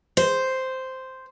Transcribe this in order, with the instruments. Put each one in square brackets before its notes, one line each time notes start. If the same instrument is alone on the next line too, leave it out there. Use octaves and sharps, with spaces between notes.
[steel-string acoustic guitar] C5